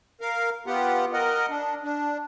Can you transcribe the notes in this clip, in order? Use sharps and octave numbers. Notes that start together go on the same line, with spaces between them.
A#4 F5
B3 F4 G4 F#5
A#4 D#5 F#5
D4
D4